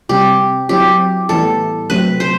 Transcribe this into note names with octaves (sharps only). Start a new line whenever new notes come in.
C3 G3 C4 G4
F#3 C4 E4 G4
A2 E3 G3 B3 E4 A4
C3 F#3 A3 C4 B4
C5